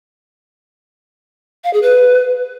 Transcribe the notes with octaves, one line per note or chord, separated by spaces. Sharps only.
F5
G#4
B4